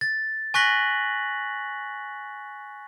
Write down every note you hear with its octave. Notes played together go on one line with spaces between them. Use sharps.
A6
G#5 C#6 F#6 A#6 B6 F#7